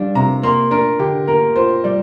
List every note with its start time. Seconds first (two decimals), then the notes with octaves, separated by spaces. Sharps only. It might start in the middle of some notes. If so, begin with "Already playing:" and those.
Already playing: G3 D4 F5
0.15 C3 A#5
0.43 A#3 C6
0.71 D4 A#4
0.99 D3 G4
1.28 A#3 A#4
1.56 F4 C5
1.84 G3 D5